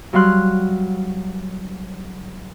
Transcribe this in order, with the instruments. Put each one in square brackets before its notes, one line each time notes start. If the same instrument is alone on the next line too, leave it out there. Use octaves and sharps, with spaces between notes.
[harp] F#3 G3 F5 C6 F#6